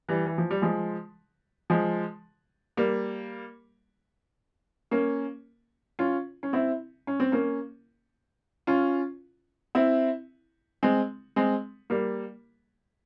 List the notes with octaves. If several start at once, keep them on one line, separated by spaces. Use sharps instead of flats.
E3 G3
E3
F3
G3
F3 G#3
F3 G#3
G3 A#3
A#3 C#4
C#4 F4
C#4
C4 E4
C#4
C4
A#3 C#4
C#4 F4
C4 E4
G#3 C4
G#3 C4
G3 A#3